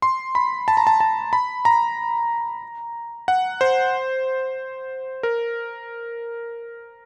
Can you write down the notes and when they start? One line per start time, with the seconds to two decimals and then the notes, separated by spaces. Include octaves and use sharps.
0.02 C6
0.35 B5
0.68 A5
0.77 A#5
0.87 A5
1.00 A5
1.33 B5
1.65 A#5
3.28 F#5
3.61 C5
5.23 A#4